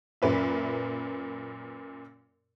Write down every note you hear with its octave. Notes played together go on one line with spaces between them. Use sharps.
F#2 A#2 B4 E5